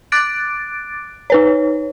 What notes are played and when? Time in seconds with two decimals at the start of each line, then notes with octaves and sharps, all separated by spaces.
0.12 D6 F#6 A6 D7
1.30 D#4 B4 C#5